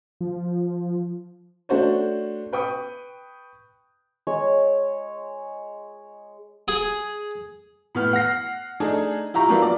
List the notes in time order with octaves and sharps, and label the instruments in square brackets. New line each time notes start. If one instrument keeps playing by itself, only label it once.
[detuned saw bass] F3
[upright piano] A3 D4 F#4 C5 C#5
B4 G5 C#6 D#6
[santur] G#3 C#5 C#6
[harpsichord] G#4
[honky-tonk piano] A2 B3 F6
F#5 F6 A#6 C7
A3 D4 D#4 G#4
E4 F4 G4 A#5 C#6
F3 F#3 A#3 B3 D4 E4
F4 D5